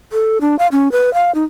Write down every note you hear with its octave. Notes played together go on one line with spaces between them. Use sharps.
A4
D4
F5
C#4
B4
F5
D#4